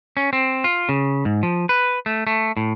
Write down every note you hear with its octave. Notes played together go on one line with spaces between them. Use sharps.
C#4
C4
F4
C#3
G#2
F3
B4
A3
A3
A2